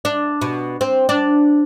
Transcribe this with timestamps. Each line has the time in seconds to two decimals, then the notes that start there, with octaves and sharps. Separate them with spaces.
0.05 D4
0.41 B2
0.81 C4
1.09 D4